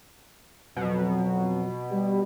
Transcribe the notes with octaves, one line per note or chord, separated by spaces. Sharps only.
F2 B2 F#3
G3